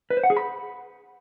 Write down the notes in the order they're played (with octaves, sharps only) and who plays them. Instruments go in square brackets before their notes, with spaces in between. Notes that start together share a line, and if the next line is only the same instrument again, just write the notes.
[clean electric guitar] B4
C5
F#5
G#4
B5